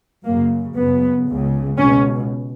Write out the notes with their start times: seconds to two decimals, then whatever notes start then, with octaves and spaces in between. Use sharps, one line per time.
0.24 F#2 C#3 A#3
0.75 F#2 C#3 B3
1.27 C#2 C#3
1.77 C#2 B2 C#4